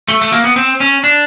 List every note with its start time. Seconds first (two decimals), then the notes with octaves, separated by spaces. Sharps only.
0.08 A3
0.22 A3
0.32 A#3
0.44 B3
0.56 C4
0.80 C#4
1.04 D4